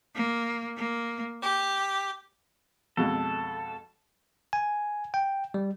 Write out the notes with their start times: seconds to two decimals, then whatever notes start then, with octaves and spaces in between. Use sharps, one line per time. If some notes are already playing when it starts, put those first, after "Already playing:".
0.14 A#3
0.77 A#3
1.42 G4
2.97 F2 B2 G#3 A4
4.53 G#5
5.14 G5
5.54 G3